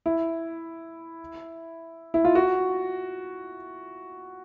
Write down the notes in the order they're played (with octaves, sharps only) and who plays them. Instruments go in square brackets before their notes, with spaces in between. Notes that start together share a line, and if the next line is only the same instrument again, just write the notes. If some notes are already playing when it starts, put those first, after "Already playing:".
[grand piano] E4
E4
F4
F#4